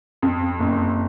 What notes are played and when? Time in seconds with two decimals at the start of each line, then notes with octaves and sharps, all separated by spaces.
0.22 F2
0.60 F#1